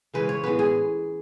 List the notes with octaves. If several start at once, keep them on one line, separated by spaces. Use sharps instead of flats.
C#3 E3 G#3 C#4 B4
C#5
A2 G#3 B3 B4
G#4